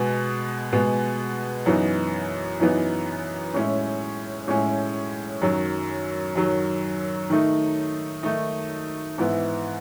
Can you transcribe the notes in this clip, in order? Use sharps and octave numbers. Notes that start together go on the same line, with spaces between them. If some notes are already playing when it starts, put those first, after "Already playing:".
Already playing: B2 G#3 B3
B2 G#3 B3
F#2 E3 B3 D#4
F#2 E3 B3 D#4
A2 G#3 C#4 E4
A2 G#3 C#4 E4
F#2 D#3 F#3
F#2 D#3 F#3
D#3 A3 D#4
D#3 A3 D#4
G#2 E3 B3 E4